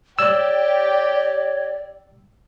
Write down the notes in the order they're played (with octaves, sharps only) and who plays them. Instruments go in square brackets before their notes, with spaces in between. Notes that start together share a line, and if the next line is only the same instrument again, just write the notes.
[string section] G4 [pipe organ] C#5 [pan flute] D5 [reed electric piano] E6